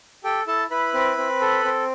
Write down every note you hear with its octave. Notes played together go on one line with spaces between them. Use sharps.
G4 A4 G5
E4 A4 A5
E4 B4 B5
C4
C4
A4
C4